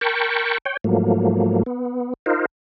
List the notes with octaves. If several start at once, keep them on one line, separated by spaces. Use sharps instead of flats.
A#4 G5 A5 B5 C#6
C#5 G5
G#2 F3 F#3 A3 A#3
B3
D#4 F4 A#4 C5